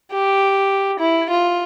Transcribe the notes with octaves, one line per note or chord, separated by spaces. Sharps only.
G4
E4
F4